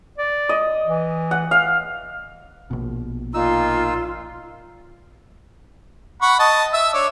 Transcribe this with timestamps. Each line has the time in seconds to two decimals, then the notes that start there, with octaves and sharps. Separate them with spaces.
0.18 D5
0.49 D#5
0.85 E3
1.31 F#5
1.51 F5
2.71 A#1 B2
3.34 A#2 D#4 F4 E6
6.22 F#5 B5 C#6
6.39 D#5 A5
6.74 E5 E6
6.94 D4 C#5 D5